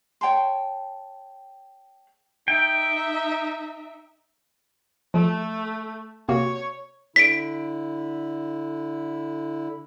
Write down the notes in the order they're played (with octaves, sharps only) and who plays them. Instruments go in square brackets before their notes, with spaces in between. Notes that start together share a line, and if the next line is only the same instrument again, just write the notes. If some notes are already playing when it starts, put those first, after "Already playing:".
[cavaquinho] C#5 G5 A5 C6
[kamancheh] D#4 E5 [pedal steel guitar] G5
[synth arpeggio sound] F3 [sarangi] A3
[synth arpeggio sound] C3 A#3 F#4 [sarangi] C#5
[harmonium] D3 E4 [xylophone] B6 D7